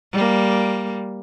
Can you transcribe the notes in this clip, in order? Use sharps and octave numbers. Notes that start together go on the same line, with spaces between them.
G3 A#3